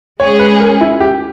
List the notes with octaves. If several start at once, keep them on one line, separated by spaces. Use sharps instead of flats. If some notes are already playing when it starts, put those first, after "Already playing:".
G#3 C#4 G#4 C#5
B4
A#4
E4
G4